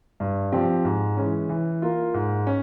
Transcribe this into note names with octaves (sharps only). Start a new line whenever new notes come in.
G2
F3 C4 G4
G#2
E3 G#3 C#4
E3
A#3 F4
G#2
C#4